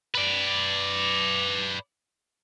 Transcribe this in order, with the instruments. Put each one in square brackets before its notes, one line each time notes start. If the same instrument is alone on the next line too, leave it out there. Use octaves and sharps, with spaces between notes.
[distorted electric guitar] B4 D5